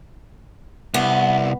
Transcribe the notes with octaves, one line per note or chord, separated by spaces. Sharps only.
C2 B3